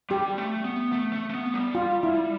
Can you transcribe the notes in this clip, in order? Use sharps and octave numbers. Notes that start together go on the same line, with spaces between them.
G3 G4
A3
B3
A3
A3
A3
B3
G3
F4
E4